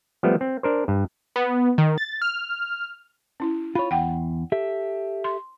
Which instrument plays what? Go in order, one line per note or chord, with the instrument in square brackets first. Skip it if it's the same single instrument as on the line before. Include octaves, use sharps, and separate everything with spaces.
[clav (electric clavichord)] F3 G3 A3 B3
C4
D4 A#4 C5
G2
[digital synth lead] B3
D#3
A6
F6
[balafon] C#4 E4
[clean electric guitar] F4 C#5 [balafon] B5
[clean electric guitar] E2 [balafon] F#5 G5
[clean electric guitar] G4 A4 E5
[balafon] C6